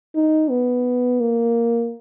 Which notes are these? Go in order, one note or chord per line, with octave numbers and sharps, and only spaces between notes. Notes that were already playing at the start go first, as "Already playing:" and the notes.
D#4
B3
A#3